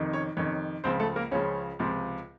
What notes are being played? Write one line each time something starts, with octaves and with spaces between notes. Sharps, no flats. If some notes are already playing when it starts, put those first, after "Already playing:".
Already playing: F2 C3 D#3
C#4 C#5
F2 C3 D#3 C#4 C#5
C#2 C#3 F3 C4 C5
A3 A4
A#3 A#4
C#2 C#3 F3 C#4 C#5
C#2 C3 F3